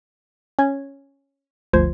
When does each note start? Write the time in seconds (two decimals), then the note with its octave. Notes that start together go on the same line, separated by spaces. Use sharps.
0.59 C#4 G#6
1.73 G1 D2 F3 C5 G#6